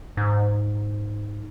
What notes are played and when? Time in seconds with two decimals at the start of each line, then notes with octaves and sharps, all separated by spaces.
0.17 G#2